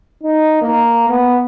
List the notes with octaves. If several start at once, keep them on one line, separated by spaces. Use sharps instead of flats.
D#4
A#3
B3